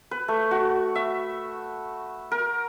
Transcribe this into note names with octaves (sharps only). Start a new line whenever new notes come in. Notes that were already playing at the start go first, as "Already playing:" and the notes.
B4
A3
F#4
E5
A#4